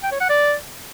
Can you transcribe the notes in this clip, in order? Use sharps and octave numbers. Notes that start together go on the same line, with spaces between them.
G5
C#5
F#5
D5